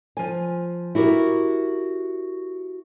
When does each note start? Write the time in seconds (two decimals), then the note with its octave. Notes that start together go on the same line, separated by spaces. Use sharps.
0.17 F3 G#5
0.95 E4 F#4 G4 A#4